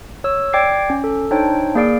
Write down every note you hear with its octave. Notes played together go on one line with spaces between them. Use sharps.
C#5 E6
D5 G5 D6 G#6 C7
C#4
A4
D4 D#4 C5 C#5 G5
A#3 G#4 D5 F5 D7